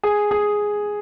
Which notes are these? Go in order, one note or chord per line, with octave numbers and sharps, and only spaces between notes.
G#4
G#4